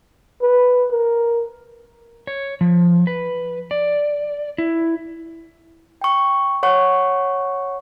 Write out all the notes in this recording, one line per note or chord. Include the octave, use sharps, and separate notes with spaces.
B4
A#4
C#5
F3
B4
D5
E4
G5 C#6
C#5 F#5 C#6